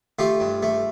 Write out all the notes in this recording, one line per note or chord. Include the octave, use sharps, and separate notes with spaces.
A3 F4 G4
G2
A3